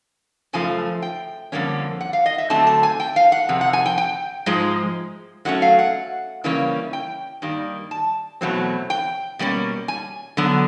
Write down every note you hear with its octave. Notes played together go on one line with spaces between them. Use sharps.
F#2 C#3 F3 A3 G#5
G5
F2 D3 G3 A#3 C#4
F#5
F5
D#5
E5
D3 F#3 A3 C4 A5
A5
G#5
G5
F5
F#5
F2 C3
F#5
G#5
G5
G5
G#2 F3 G#3
A2 F#3 A3 C#4 F#5
F5
F#5
C#3 E3 G3 A#3 C#4
G5
G2 D#3 G3 A#3
A5
E2 B2 F#3 A3 C4
G5
B2 G3 A#3 C#4
G#5
D3 F#3 B3